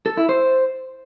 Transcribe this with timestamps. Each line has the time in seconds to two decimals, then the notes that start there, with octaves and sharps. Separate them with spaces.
0.06 A4
0.17 E4
0.29 C5